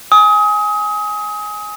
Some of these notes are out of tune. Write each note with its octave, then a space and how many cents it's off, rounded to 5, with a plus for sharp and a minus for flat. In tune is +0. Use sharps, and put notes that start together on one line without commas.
G#5 +0 D#6 +30